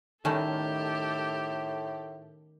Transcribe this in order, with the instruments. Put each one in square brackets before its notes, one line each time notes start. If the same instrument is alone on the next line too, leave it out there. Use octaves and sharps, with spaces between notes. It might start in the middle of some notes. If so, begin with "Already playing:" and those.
[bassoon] A2 [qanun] D#3 [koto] G3 A3 C#4 [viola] G4 A4